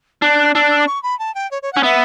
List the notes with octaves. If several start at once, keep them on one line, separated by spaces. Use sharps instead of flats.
D4 F#6
D4 E6
F#6
E6
D6
C#6
B5
A5
G5
C#5
C#5
C#4 F#5
B3 E5